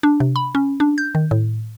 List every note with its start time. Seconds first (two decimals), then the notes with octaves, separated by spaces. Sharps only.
0.03 D4
0.20 C3
0.36 B5
0.55 C#4
0.80 D4
0.98 G6
1.15 D#3
1.31 A2